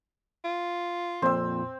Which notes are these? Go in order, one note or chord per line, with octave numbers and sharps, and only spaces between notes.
F4
F2 A#2 C4 E6